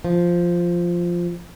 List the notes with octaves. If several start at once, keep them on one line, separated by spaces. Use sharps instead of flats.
F3